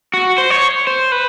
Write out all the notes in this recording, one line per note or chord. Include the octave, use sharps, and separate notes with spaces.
F#4
C5
C#5
C5
B4